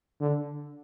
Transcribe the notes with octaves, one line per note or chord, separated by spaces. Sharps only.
D3